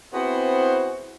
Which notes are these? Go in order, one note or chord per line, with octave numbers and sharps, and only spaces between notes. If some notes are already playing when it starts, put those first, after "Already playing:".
B3 C4 E4 F#4 G#4 C5